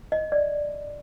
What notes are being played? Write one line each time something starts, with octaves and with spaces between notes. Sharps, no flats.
D#5
D5